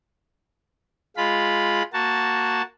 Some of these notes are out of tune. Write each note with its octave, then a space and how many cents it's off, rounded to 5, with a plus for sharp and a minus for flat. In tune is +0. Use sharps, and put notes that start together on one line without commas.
G#3 +0 F4 +0 B5 +0
A#3 -5 F#4 +0 A5 +0